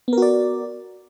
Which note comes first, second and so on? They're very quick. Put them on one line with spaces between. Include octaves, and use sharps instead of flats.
B3 A#4 F#4 D5